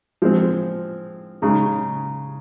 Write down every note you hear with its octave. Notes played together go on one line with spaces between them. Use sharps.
F3 G#3 C4
C#3 G#3 D#4